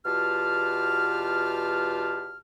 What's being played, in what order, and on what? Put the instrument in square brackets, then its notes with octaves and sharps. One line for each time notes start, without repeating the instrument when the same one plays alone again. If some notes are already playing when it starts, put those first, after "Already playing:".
[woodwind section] E2 B2 F4 G4 A5 F6